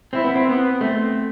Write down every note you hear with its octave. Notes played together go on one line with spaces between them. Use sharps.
C4 E4
B3
C4
B3
A3 C4